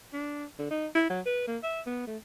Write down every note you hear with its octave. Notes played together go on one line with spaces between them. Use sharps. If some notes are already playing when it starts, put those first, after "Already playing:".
D4
D3
D#4
E4
F#3
B4
A#3
E5
B3
A3